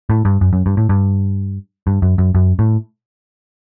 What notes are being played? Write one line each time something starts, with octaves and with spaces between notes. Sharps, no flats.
A2
G2
F#2
F#2
G2
A2
G2
G2
F#2
F#2
F#2
A2